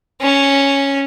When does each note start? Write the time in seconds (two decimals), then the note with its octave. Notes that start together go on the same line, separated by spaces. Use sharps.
0.22 C#4